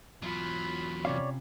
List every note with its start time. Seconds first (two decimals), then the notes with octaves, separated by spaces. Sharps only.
0.22 E2 F#3 F4 B5
1.05 C3 C#4 C#5 D5 F5